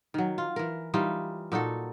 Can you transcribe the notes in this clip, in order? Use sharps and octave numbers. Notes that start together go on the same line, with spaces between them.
D#3 F#3
F4
E3 A#4
E3 G3 D#4 F4
A#2 D#4 F#4 A4